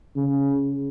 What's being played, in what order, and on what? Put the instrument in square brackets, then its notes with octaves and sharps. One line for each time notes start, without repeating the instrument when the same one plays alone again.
[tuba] C#3